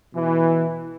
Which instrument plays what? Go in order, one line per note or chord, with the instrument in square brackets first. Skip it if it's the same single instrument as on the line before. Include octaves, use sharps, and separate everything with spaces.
[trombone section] B2 E3